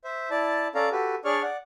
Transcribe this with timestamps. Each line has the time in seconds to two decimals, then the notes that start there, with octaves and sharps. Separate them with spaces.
0.04 C5 E5
0.30 E4 D5 A5
0.75 C#4 A4 D5 F5 A#5
0.92 F#4 G4 A4 B4
1.25 D4 G#4 C#5 D5 C#6 F6
1.43 D5 F#5